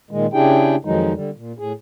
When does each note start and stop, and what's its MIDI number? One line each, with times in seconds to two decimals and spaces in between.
0.11 0.26 46
0.11 0.26 51
0.11 0.26 56
0.33 0.76 49
0.33 0.76 62
0.33 0.76 64
0.33 0.76 67
0.33 0.76 68
0.33 0.76 79
0.85 1.13 41
0.85 1.13 51
0.85 1.13 53
0.85 1.13 54
0.85 1.13 56
0.85 1.13 63
1.14 1.30 50
1.14 1.30 55
1.36 1.52 46
1.59 1.73 45
1.59 1.73 68